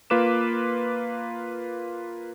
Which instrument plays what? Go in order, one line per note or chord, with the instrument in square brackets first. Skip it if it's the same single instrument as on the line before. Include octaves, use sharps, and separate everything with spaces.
[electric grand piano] A#3 F4 B4 D6 E7